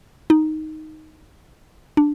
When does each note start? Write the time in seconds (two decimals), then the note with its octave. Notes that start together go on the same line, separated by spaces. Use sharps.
0.30 D#4
1.97 D4